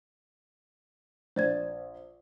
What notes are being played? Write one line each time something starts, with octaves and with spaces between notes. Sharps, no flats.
A#1 C5 D5 G#6